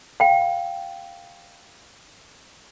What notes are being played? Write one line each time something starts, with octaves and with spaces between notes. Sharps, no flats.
F5 G5